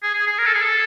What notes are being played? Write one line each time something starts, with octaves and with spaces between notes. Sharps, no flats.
G#4
G#4
G#4
A#4
A4
G#4
A4